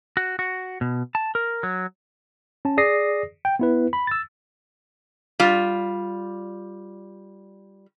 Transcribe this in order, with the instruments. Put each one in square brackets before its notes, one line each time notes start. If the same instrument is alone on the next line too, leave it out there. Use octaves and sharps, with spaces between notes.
[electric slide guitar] F#4
F#4
B2
A5
A#4
F#3
[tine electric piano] C#4 A5
G#4 D5 D#6 A#6 C7
G5
B3 E4 B4
B5
E6 A6
[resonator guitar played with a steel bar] G3 F4